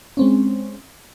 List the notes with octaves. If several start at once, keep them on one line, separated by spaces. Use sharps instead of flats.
G#3 C4 C#4